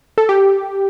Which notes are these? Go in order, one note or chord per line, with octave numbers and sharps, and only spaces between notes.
A4
G4